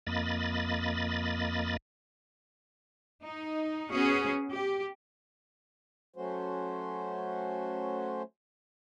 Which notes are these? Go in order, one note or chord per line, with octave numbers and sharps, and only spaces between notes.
F2 A#3 D#5 B5 A6
D#4
B3 C#4 F#4 G#4
G4
F#3 A3 C#4 F#4 C5